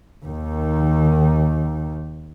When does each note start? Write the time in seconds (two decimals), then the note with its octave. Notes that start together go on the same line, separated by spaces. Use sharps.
0.25 D#2 D#3